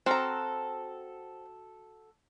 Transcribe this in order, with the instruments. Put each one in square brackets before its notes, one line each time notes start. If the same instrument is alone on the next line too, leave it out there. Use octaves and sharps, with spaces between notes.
[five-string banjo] C4 A#5 [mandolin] F#4 A4 F6